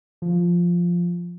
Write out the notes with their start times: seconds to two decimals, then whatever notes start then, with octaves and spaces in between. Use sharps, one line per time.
0.22 F3